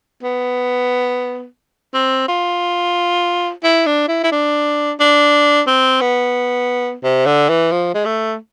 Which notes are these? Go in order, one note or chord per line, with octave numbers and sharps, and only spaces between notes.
B3
C4
F4
E4
D4
E4
E4
D4
D4
C4
B3
C3
D3
E3
F3
G#3
A3